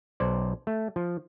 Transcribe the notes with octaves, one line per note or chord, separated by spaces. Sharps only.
B1 C5 D5
A3
F3